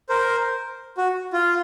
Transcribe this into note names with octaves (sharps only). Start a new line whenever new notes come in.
A#4 C5
F#4
F4